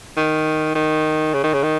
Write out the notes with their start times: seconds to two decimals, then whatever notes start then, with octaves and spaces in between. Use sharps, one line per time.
0.17 D#3
0.75 D#3
1.34 C#3
1.44 D#3
1.54 C#3
1.63 D#3